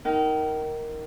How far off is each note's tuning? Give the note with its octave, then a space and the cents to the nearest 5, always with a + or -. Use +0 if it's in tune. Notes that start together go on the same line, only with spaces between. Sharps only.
D#4 +15 A#4 +0 G5 -35